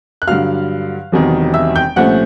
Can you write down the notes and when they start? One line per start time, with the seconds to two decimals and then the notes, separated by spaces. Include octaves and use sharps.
0.22 F#6
0.28 G2 D3 F#3 F5 F6
1.12 E1 E2 C3 D#3 F#3
1.54 E5 E6
1.76 G5 G6
1.96 C2 A#2 F3 A3 C#4 F#5 F#6